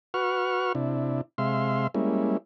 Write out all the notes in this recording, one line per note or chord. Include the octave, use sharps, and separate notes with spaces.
F#4 B4 F#5 C#6 F6
C3 D4 E4
C3 G#3 E5 F5 C6
G3 G#3 A#3 C#4 E4